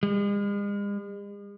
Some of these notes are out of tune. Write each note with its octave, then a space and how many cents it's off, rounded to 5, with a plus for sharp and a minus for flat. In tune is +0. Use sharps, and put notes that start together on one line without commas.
G#3 -45